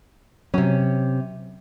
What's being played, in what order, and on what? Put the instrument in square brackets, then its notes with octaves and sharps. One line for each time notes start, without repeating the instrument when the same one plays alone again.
[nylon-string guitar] C3 C#4 [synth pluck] F#3